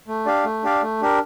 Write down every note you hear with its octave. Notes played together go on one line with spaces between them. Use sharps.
A3
D4 G4 D5 F5
A3
D4 G4 D5 F5
A3
D4 G4 A#4